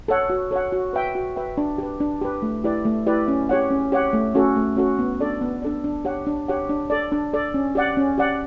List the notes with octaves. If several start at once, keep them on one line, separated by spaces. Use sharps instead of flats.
A4 C#5 F#5
F#4
A4 C#5 F#5
F#4
B4 E5 G5
F#4
B4 E5 G5
D4
G4 B4
D4
G4 B4
A3
E4 G4 B4 D5
A3
E4 G4 B4 D5
C#4
G4 C#5 F#5
C#4
G4 C#5 F#5
A3
C#4 F#4 A4
A3
C#4 F#4 A4
B3
D4 A4 D5
B3
D4 A4 D5
D4
G4 C#5 F#5
D4
G4 C#5 F#5
D4
A4 D5
D4
A4 D5
C#4
G4 D5 F#5
C#4
G4 D5 F#5